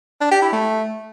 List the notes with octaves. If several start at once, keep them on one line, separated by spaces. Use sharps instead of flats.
D4
G4
E4
A3